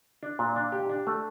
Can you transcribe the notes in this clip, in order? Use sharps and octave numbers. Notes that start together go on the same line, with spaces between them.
D4
A#2
D4
G4
D4
A3